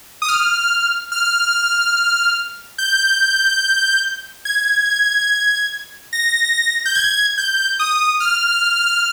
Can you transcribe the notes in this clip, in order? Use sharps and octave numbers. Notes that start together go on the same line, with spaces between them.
D#6
F6
F6
G6
G#6
A#6
G6
G#6
G6
D#6
F6